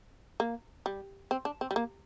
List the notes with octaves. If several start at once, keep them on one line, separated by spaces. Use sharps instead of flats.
A#3
G3
C4
D4
C4
G3
A#3